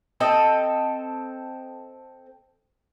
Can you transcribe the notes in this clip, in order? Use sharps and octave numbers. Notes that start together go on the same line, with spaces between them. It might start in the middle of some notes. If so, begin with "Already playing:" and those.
C4 A4 D#5